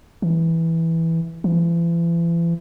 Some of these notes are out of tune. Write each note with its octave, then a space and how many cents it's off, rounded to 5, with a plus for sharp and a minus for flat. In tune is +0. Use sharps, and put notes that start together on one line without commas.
E3 -5
E3 +40